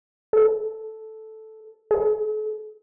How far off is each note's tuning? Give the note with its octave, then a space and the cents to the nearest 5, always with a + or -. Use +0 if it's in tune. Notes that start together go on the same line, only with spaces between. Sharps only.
A4 -5
A4 -45